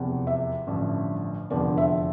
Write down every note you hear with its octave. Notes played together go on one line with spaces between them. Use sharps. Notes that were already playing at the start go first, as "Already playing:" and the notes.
Already playing: F1 E2 C3 F3
E5
A1 G2 D3 F3
F1 E2 D3 F3 D5
E5